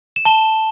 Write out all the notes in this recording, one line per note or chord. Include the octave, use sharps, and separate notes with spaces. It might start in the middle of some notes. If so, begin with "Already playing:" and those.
E7
A5 G7